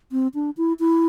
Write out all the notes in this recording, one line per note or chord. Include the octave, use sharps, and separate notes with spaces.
C4
D4
E4
E4